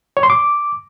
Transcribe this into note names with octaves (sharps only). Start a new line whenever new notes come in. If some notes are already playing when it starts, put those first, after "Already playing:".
C#5
C6
D6